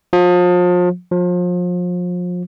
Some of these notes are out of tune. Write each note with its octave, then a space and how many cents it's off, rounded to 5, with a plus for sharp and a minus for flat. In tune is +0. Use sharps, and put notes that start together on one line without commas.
F3 +35
F3 +35